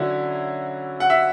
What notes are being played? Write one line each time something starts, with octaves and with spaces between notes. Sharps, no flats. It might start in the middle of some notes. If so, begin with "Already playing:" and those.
Already playing: D3 F#3 C#4 E4
F#5
E5